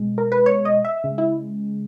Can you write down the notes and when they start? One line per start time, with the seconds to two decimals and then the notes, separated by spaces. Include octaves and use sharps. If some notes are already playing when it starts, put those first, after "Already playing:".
Already playing: B2 G#3
0.18 A#4
0.32 B4
0.46 C#5
0.65 D#5
0.85 E5
1.04 C#3 G#3
1.18 E4